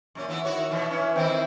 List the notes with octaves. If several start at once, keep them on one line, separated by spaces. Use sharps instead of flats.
F#2 A#2 C#4
E3 B3 E4
D#3 E4 F#4 C#5
B2 E3
E3 C#4
D#3 E3 C4 E4